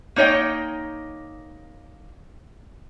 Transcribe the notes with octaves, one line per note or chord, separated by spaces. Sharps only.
A#3 D#4 C#5 D#5 G5